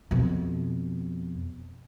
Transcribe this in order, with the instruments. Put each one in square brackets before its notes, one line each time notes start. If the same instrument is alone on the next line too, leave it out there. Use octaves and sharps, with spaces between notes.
[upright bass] F2 B2